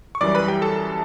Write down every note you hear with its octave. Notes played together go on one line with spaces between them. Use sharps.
C#6
F#2 E3 G3 D5 D6
B4 B5
G4 G5
A4 A5